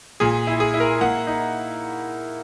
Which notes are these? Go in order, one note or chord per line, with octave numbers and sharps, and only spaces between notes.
A#2 G#4
E4
G#4
E4
A#4
A#3 F#5
D#4